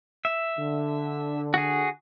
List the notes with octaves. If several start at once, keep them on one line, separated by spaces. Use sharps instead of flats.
E5
D3
F#4 G#4